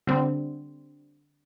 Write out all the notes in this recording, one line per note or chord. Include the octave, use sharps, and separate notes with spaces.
D3 G3 C4